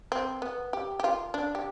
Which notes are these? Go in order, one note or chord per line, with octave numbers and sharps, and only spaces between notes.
C4
B3
G4
G4
F4
D4
G4